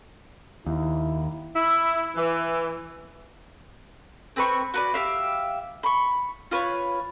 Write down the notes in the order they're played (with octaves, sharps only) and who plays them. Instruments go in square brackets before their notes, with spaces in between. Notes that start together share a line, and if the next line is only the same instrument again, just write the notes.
[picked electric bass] D#2 [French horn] E4
[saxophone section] E4
E3
[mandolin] C4 B4 C#6
F#4 B4 D5
G4 E5 F5
B5 C#6
F4 B4 C#5